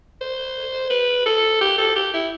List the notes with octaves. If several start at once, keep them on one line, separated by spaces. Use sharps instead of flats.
C5
B4
A4
G4
A4
G4
E4